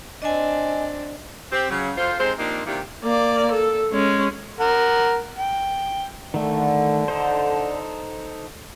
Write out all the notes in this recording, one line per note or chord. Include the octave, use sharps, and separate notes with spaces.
C4 D4 D#5 G#5
C4 G4
C#3 F#3
F2 F4 C5
C3 G#3 C4 D#4 C5
F3 A#3 C4 D4 D#4 G4
C3 D#3 A#3 D4 E4 G4
A#3 D5
A4
G#3 C#4
A#4 F#5
G5
D3 D#3 A3
D#4 A4 C5